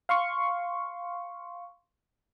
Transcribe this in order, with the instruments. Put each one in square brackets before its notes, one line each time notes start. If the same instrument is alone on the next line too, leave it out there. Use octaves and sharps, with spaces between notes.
[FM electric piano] F5 C6 C#6